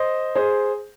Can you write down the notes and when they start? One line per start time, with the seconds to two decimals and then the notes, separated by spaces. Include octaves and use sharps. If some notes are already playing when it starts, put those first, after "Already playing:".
Already playing: C5 D#5
0.35 G#4 C5